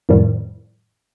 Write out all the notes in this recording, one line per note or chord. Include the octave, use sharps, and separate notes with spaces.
F2 A2 D#3 F3 G3